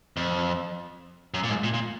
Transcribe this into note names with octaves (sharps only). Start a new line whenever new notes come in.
F2
F#2
A#2
G#2
A#2
A#2